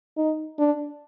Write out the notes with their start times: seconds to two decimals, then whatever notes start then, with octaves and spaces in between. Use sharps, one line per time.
0.17 D#4
0.59 D4